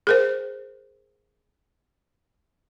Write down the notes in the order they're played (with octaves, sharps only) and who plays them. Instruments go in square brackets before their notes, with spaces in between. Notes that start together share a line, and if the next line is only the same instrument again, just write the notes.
[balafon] G#4 A#4 C5